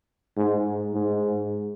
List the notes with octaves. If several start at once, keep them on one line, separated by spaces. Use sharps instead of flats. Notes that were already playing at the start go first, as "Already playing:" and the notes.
G#2
G#2